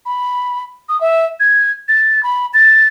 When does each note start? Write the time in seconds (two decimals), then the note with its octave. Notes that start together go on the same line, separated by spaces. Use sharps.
0.06 B5
0.89 D#6
1.01 E5
1.40 G#6
1.88 A6
2.23 B5
2.54 A6